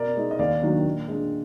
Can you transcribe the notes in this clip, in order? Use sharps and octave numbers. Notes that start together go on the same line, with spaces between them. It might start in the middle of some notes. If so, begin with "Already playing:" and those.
Already playing: B2 A#4 D5
G#3 D#4
D#5
D#2 D5 F5
D#3 F#3 A#3 D4
A#2
G#3 D4